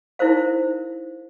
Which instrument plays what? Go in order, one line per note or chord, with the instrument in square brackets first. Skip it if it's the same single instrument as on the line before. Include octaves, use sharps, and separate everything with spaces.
[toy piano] D#4 E4 A#4 C5 F5